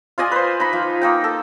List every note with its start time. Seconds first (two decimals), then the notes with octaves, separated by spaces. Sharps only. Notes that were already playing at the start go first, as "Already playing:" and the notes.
0.18 F4 D5 D#5 G#5
0.32 B4 C5
0.60 D#4 B5
0.73 F3
1.01 A#3 D#4 G5
1.24 A4